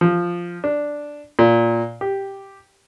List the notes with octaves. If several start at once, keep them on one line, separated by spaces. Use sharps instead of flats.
F3
D4
A#2
G4